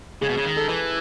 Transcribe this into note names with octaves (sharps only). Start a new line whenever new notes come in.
C#3 G#3
B2
C#3
D#3
A4
E3